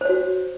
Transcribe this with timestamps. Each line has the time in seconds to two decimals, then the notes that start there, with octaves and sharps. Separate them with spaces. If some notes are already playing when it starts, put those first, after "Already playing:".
0.01 C5
0.05 C#5
0.09 F#4